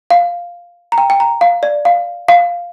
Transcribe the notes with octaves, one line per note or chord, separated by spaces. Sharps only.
F5
A#5
G5
G5
A#5
F5
D5
F5
F5